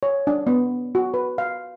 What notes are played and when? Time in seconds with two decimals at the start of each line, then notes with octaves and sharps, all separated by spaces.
0.03 C#5
0.27 D4
0.47 B3
0.95 F#4
1.14 B4
1.38 F5